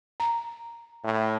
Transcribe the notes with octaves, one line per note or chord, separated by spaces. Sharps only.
A#5
A2